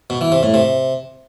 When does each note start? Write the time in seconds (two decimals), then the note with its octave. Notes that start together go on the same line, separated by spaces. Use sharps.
0.10 B2
0.21 E3
0.32 C3
0.43 A2
0.54 C3